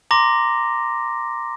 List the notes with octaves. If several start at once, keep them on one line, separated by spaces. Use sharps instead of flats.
A#5 C6 D6 A#6